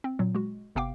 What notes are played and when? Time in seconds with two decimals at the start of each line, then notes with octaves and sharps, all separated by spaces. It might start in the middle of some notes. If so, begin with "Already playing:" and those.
0.04 C4
0.19 A#2 F#3
0.35 G#3 F#4
0.75 G1 C3 B3 F5 G5 D6